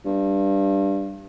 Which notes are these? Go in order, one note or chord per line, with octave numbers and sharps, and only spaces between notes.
G2